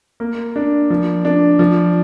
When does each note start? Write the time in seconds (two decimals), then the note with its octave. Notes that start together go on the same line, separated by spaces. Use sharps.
0.20 A#3
0.56 D4
0.90 F3
1.25 D4
1.59 F3